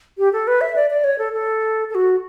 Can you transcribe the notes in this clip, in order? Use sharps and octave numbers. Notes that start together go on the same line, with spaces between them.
G4
A4
B4
E5
D5
D5
C#5
A4
A4
A4
F#4